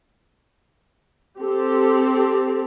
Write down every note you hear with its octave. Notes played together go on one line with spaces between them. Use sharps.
C4 G4 A4